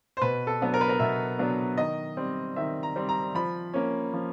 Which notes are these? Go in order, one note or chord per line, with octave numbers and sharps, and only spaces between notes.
C5
B2 B4
A4
F#3 B3 D4
A#4
B4
A#4
B2 E5
F#3 B3 D4
D#3 D#5
G3 C4
D#3 E5
A#5
G3 C4
A#5
F3 B5
A#3 C#4
F3